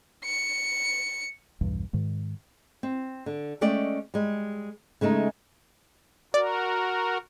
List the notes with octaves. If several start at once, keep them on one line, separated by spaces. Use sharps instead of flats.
C#7
B1 E2 G2
G#2 D#3 G#3
C4
D3
G#3 A3 C#4 D5 D#5 G5
G3 G#3
C#3 G#3 A3 D#4
F#4 A#4 D5